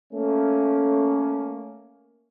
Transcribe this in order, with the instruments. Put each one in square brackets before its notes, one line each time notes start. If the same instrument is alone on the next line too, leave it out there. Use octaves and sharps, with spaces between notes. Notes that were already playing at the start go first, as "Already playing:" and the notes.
[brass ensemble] A3 A#3 C#4